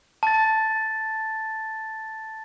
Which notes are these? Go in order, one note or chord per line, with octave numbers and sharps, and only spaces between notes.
A5 A6